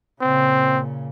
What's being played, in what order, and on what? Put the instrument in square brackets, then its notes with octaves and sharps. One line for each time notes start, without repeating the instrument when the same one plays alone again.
[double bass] A#2 C#3 [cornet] C4